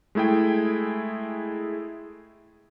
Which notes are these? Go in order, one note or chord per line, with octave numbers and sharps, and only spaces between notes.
G#3 A3 E4 G#4 G5